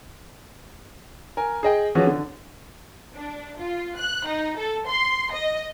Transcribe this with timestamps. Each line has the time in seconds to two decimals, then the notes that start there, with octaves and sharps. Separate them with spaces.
1.37 A#4 G#5
1.63 G#4 D#5 G5
1.95 E3 F3 G#3 C#4 F#4
2.07 D3
3.15 D4
3.59 F4
3.97 F#6
4.27 D#4
4.58 A4
4.86 C6
5.32 D#5